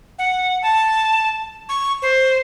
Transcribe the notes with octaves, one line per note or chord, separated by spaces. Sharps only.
F#5
A5
C#6
C5